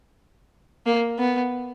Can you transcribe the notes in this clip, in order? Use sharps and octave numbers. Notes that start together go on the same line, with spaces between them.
A#3
B3